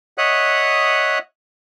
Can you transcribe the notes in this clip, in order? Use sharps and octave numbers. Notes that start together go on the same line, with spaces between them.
C#5 D#5 E5 F#5 D#6 F#6